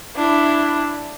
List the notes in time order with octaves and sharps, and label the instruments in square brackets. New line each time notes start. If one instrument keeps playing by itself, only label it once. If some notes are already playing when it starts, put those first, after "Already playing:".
[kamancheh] D4 E4